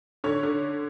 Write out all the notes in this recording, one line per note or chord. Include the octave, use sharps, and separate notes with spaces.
D3 C#5
D3